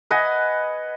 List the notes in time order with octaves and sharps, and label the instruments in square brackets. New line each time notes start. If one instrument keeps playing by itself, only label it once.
[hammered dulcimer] B4 D#5 F#5 G#5